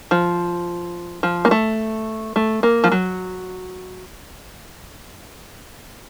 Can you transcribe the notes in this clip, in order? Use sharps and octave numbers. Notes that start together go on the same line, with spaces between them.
F3
F3
A#3
A3
A3
A#3
F3
F#3